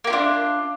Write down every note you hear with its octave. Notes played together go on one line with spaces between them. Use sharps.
A#3 D4 F4 G4